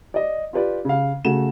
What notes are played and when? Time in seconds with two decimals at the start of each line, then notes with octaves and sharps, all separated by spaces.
0.14 D5 D#5
0.53 F4 G4 B4 D5
0.85 C#3 F5
1.25 C#3 A3 F#4 E7